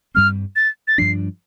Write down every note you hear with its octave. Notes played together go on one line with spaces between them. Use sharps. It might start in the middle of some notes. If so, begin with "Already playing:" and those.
G2 G3 C4 F6
A6
A6
G2 F3 D4 C7